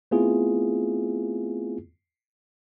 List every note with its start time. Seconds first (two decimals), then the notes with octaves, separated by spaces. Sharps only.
0.11 A3 B3 C4 E4 F4 G#4